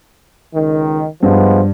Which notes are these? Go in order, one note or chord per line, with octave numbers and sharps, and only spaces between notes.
C#2 D#3
G2 F3 G#3 B3